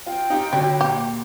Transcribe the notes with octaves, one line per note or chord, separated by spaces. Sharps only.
F4 G5
D#4 F4 G4
D3 G3 C#4 F#4
A#2 G4